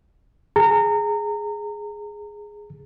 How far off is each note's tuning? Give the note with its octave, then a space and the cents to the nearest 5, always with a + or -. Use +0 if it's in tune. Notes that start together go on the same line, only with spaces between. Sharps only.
G#4 +0 A#5 -25